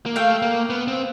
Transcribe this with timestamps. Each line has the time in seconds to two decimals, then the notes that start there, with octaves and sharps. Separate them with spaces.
0.06 A#3
0.16 A3 F5 G5
0.42 A#3
0.70 B3
0.88 C4